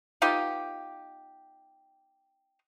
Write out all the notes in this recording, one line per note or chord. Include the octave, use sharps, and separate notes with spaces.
B3 D#4 F4 G4